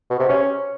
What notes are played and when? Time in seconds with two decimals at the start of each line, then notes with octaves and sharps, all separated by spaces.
0.10 B2
0.20 C3
0.29 C#4